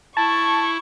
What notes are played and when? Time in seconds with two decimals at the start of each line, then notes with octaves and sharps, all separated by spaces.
0.17 E4 A5 C#6